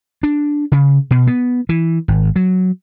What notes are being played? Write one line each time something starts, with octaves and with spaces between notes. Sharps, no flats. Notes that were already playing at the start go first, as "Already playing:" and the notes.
D4
C#3
B2
B3
E3
G#1
F#3